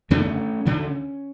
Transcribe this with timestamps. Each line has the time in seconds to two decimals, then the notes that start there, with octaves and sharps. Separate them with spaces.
0.10 F#2 D3 A3 C#4
0.65 D2 D3